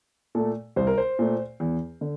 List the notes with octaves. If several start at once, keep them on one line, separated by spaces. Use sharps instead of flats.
A#2 A3 A4
C2 C5
A#4
C5
A#2 A3
E2
D3